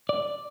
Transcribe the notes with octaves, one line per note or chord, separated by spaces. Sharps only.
D5